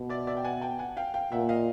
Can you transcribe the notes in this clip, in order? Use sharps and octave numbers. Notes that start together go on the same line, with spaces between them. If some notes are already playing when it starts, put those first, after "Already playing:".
Already playing: B2
D5 E5
D5 E5
G5
F#5 G#5
G5 A5
F#5 G#5
F5 G5
F5 G5
A#2 E5 F#5
D#5 F5